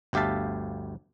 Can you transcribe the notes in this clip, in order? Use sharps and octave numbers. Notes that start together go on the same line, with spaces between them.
G1 D2 G4 E5 F5 A5